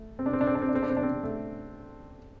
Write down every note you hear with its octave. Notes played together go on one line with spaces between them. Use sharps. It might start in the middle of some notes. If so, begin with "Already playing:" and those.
Already playing: A3
C4
D4
C4
D4
C4
D4
C4
D4
C4
D4
C4
D4
C4
A3